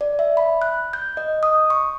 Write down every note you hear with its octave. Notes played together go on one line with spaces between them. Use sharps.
D5
E5
B5
F#6
G6
D#5
D#6
C#6